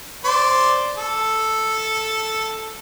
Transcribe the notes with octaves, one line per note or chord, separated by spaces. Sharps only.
C5 D5
A4